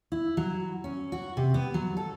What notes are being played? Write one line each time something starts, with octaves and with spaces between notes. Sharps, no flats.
E4
F#3
C#4
F#4
C3
B3
F#3
A4